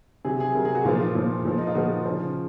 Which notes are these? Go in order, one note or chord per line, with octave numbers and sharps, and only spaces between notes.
C3 F#3 G#4
G#4
C3 F#3 A#4
G#4
F#4
A#2 F3 F4
F4
A#2 F3
A#2 F3
D#4
F4
A#2 F3 F#4
C#3 F3